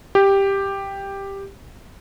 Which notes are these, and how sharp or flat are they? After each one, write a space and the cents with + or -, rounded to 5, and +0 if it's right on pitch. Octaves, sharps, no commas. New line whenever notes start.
G4 +5